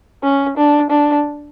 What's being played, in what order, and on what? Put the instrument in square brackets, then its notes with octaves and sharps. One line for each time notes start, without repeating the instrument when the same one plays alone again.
[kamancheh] C#4
D4
D4